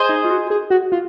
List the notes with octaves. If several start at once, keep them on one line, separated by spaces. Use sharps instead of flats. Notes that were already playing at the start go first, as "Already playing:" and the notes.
Already playing: G#4 C5 D#5 G#5
D#4
F4
F#4
G#4
F#4
F4